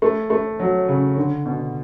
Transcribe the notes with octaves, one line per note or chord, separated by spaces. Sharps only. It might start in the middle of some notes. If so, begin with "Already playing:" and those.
A3
A3
F#3
C#3
D3
B2